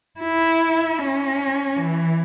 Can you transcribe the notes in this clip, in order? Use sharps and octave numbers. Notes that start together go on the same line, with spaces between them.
E4
C#4
E3